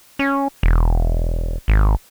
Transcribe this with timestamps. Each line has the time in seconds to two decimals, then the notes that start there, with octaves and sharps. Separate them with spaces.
0.19 C#4
0.63 E1
1.68 G#1